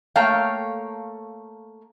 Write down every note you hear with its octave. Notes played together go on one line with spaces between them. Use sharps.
A3 A#3 A4 C#5 F5 G5